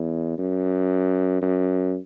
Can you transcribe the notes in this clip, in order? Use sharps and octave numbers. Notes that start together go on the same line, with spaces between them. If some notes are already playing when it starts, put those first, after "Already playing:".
Already playing: E2
F#2
F#2